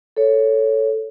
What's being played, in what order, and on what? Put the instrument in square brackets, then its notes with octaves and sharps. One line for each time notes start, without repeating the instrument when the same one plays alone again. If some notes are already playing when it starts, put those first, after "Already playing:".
[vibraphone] A4 C#5